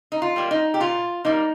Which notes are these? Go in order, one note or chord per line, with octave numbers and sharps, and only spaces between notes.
D#4
F4
G3 A#3
D#4
G4
A#2 F4
G3 A#3 D#4